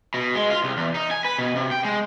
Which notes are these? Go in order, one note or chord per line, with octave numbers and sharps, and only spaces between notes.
B2
G#3
F4
C2
E2
D#4
G#5
B4
B2
C3
G5
G#3